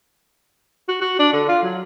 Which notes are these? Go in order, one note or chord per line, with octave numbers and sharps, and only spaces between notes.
F#4
F#4
D4
D3
F4
F#3